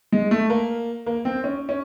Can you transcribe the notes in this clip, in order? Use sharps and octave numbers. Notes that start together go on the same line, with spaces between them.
G#3
A3
A#3
A#3
C4
C#4
C#4